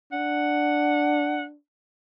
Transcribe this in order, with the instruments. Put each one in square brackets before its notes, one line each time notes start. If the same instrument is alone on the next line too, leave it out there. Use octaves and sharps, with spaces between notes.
[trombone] D4 [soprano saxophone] F#5